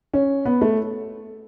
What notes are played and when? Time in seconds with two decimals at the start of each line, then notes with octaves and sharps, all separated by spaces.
0.13 C#4
0.45 B3
0.61 A3